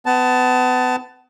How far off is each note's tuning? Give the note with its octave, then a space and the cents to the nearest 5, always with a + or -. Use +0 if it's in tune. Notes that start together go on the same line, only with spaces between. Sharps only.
B3 +30 A5 +0